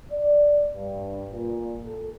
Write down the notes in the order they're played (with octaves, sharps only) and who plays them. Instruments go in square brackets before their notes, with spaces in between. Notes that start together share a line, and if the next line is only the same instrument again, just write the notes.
[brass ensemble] D5
G2
A#2
A4